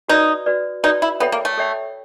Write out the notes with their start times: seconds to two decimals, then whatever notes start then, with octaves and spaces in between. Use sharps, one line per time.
0.09 D#4 F#4 B4 D5
0.46 F#4 B4 D5
0.83 D#4 F#4 B4 D5
1.02 E4
1.20 B3 A4 C#5 E5 G5 B5
1.32 A#3
1.45 A3
1.58 A4 C#5 E5 G5 B5